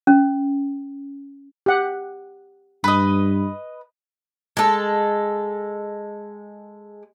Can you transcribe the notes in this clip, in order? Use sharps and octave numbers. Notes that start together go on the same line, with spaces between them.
C#4
G4 F#5
G2 B4 D#5
G#3 A4